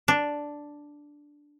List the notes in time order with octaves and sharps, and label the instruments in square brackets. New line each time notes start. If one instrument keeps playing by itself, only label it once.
[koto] D4